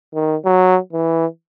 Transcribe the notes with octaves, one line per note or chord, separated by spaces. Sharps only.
D#3
F#3
E3